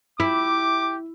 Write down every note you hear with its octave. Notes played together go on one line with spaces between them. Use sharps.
E4 G4 D6